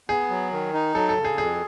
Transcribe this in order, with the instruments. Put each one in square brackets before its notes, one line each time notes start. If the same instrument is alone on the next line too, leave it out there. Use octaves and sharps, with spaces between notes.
[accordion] B3 [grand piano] G#4
[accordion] F#3
D#3
D#4
[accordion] F#3 [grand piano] A4
[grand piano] A4
[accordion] C#3
[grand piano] G#4
[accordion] F2 [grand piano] G#4